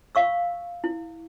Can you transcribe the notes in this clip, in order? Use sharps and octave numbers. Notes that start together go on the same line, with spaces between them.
F5 C#6 E6
E4